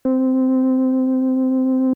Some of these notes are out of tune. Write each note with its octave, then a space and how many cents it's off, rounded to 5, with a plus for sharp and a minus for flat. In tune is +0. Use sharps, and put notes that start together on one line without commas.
C4 -10